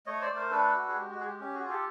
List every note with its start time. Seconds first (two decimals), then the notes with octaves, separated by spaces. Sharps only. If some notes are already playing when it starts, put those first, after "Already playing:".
0.06 A3 C#5 D#5
0.21 C5 D5
0.29 A3
0.36 A#4 C5
0.51 D4 A4 B4
0.73 F#4
0.88 G#4
0.95 G#3 G4
1.11 F#4
1.18 G#3 G#4
1.25 G4
1.40 C#4 G4
1.54 F#4 G#4
1.62 F4
1.69 G4 A4